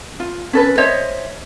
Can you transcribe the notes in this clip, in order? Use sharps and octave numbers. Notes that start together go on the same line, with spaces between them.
F4
C#4 A4 B4
C5 C#5 D#5 E5